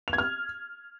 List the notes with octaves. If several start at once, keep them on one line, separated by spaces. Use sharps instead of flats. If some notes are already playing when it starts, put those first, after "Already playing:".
F7
G#6
F6